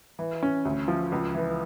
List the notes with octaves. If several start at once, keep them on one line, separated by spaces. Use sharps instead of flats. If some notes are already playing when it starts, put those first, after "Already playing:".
E3
C#4
D2
F3
C#2
E3